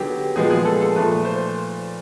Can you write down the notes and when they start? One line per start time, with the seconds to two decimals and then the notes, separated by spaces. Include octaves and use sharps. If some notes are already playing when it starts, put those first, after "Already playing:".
Already playing: D3 F#3 B3 G4 G#4
0.36 A#2 F3 G#3 B3 G#4
0.50 G#4
0.65 A4
0.81 A4
0.96 A#2 F3 A3 B4
1.25 C5